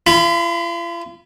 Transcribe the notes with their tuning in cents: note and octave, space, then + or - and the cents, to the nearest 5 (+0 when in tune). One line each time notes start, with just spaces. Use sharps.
F4 -45 B5 +0